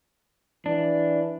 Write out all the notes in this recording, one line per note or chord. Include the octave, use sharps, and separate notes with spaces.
E3 D4